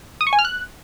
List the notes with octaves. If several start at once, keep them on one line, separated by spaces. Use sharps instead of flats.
D#6
C#6
G#5
F6
F#6